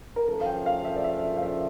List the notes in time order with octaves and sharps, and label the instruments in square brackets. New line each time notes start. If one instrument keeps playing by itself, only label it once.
[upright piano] A#4
[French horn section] D2 C#3 F3 A3 C#4 [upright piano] A4
[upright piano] F5
G5
F5
E5
D5
E5
F5
E5